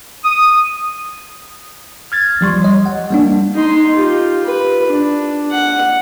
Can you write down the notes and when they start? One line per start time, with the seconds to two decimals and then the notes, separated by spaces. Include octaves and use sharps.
0.24 D#6
2.12 F6 G#6 A6
2.41 F3 G3 C6 C#6
2.62 C#5 D#5
2.86 F#5
3.11 G3 A#3 D4
3.55 D#4 C6
3.93 F4 G4
4.44 B4
4.87 D4
5.51 F#5